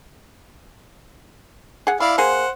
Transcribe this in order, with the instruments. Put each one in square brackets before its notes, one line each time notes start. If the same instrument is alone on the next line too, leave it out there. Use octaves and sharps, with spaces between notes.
[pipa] G#4 F#5
[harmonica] E4 D5 F5 [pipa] B5
[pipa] A#3 G#4 [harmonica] C5 F#5